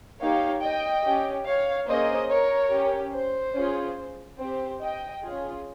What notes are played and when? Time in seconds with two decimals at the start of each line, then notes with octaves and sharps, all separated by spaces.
0.20 A#3 D#4 G4 C#5 F5
0.62 D#5 G5
1.04 C#4 G4
1.46 C#5 F5
1.88 A#3 C#4 G#4 C5 D#5
2.30 A#4 C#5
2.72 C#4 G4
3.14 C5
3.55 C#4 F4 G#4
4.39 C4 G4 C5
4.81 D#5 G5
5.23 C#4 F4 G#4